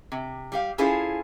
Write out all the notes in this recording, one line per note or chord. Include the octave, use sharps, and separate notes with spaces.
C3
G3 G4 F5
C#4 E4 F4 G#4 A4 C5